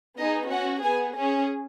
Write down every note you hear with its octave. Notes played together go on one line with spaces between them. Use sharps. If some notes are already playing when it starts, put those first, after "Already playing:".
B3 D#4 G#4 D#5
C#4 F#4 F#5
B3 G#4 G#5
C#4 G#4